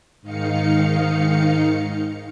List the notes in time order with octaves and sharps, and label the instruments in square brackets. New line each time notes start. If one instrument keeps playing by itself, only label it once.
[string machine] G#2 D#3 D#4 F5 C#7